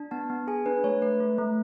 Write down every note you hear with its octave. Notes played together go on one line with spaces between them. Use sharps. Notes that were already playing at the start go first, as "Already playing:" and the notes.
Already playing: D4
B3 A5
B3
G#4 G#5
D4 B4
A3 C#5
A3 B4
A3
A3